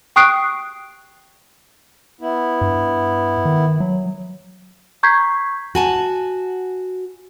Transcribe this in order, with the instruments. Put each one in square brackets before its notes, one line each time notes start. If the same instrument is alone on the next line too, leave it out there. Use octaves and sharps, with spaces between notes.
[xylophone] G5 C#6 D#6 F#6 C7 D7
[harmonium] B3 E4
[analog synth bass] G2
D#3
F#3
[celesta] A#5 C#6 G6 G#6 B6 C7
[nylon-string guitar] F#4 G#5 A5